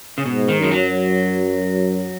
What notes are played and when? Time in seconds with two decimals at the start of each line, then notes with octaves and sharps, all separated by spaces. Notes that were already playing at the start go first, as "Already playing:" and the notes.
0.18 C#3
0.26 G#2 B2
0.49 D#3
0.60 F#2 G#3
0.72 F#3